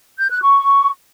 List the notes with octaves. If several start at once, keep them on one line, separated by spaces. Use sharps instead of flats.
G6
F#6
C#6